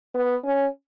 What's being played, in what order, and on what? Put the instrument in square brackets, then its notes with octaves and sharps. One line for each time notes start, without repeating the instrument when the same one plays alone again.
[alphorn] B3
C#4